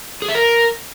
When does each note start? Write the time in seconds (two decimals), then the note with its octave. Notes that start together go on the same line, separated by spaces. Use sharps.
0.22 G#4
0.28 E5
0.35 A#4